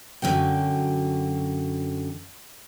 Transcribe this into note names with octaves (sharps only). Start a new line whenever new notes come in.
F#2 D3 F#3 G5